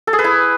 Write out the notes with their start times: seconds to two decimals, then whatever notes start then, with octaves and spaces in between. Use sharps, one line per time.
0.07 A4
0.13 G#4
0.19 B4
0.24 E4